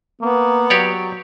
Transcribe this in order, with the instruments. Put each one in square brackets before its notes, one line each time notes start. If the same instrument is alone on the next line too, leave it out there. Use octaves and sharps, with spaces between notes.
[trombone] A#3 [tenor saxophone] B3
[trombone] F#3 [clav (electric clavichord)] G4 C#5 D5